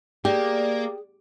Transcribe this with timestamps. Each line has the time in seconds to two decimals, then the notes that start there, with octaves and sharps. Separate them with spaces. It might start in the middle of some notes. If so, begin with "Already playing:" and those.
0.25 A#3 G4 G#4 D5